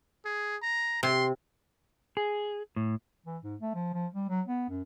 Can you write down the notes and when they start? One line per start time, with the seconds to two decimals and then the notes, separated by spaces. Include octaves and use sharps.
0.25 G#4
0.62 A#5
1.03 C3 C6
2.17 G#4
2.76 A2
3.26 E3
3.43 G#2
3.61 A3
3.75 F3
3.94 F3
4.15 G3
4.29 F#3
4.48 B3
4.69 F#2